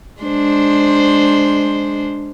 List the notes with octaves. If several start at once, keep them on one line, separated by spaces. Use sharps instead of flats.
G#3 D4 C5